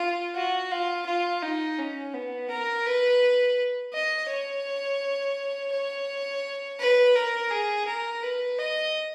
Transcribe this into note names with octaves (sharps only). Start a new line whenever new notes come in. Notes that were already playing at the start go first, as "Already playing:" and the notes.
Already playing: F4
F#4
F4
F4
D#4
C#4
B3
A#4
B4
D#5
C#5
C#5
B4
A#4
G#4
A#4
B4
D#5